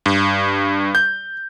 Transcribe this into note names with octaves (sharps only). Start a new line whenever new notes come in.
G2
G6